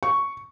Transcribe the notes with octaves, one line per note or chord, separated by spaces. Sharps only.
C#6